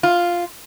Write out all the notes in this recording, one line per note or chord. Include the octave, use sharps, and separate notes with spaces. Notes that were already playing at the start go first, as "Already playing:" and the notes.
F4